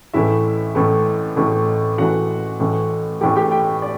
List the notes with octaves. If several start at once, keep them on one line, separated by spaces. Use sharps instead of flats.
A1 A2 E3 A3 E4 E5
A1 A2 E3 A3
A1 A2 E3 A3
A1 A2 E3 A3 F#4 F#5
A1 A2 E3 A3
A1 A2 E3 A3 G4 G5
G4 G5
G4 G5
D5